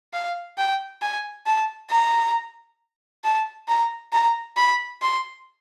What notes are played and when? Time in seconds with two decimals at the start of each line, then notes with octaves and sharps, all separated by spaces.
0.13 F5
0.58 G5
1.02 G#5
1.46 A5
1.91 A#5
3.24 A5
3.68 A#5
4.13 A#5
4.57 B5
5.02 C6